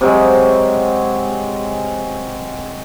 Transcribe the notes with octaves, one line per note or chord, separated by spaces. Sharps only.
C3 F#3 G#3